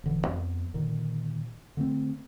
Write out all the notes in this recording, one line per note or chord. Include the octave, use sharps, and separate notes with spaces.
E1 D3 E3
F2 B3
A#2 D3 D#3
D3 A3 A#3 C4